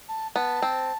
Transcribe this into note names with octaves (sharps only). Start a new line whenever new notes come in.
A5
B3 A5
C4